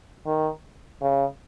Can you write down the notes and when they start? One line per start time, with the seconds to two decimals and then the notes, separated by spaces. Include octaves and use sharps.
0.26 D#3
1.02 C#3